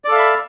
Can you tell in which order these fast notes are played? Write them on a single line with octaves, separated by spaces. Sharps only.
D5 A4 F5 E5 B5